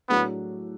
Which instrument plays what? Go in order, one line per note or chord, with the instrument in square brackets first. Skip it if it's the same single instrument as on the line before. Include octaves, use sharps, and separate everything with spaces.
[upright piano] A2 F#3 A3 D4 G#4 [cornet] B3